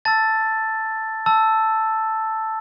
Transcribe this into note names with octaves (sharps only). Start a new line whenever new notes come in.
A5 E6 A6
A5 E6